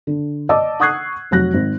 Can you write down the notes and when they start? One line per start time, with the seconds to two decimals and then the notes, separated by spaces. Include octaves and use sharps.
0.07 D3
0.49 D5 D#5 A5 D6 E6
0.80 F#5 C#6 D#6 F#6 G#6 C7
1.31 F1 F#3 F#6 A#6
1.53 G#1